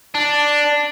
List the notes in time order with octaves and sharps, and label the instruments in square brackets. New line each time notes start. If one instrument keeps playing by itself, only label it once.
[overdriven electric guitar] D4